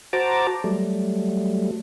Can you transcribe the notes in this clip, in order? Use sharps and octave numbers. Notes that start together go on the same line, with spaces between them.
F#4 C5 A5 A#5 D6
F#3 G3 A3